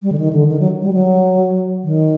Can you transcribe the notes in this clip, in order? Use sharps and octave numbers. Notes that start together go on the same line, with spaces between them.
G3
D3
D#3
D3
D#3
F#3
G3
F#3
D#3